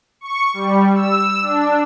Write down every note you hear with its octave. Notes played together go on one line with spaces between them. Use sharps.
C#6
G3
E6
D4